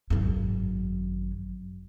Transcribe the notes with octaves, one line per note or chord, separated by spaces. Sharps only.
G#1 F#2